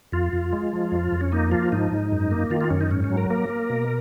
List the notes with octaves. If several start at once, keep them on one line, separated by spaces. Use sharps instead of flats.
F2 F4
F2
G#3
F3
F2
F2
C#4
A#3 D#4
F3 F4
G#2 D#4
G#2
F#2
A#3
D#3 F4
F4
F#2 C#4
D#4
G#2 C#4
C#4
F#3
A#4
A#3 A#4
A#3
B2